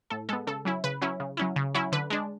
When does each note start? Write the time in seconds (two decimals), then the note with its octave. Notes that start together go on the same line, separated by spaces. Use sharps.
0.10 A2 A4
0.29 G#3 B3 A4
0.47 C#3 A4
0.65 F#3 C#4 E4
0.84 C#3 B4
1.01 F#3 C#4 E4
1.20 C#3
1.37 F#3 C#4 E4
1.56 C#3
1.75 F#3 C#4 E4
1.92 D3 B4
2.10 G#3 D4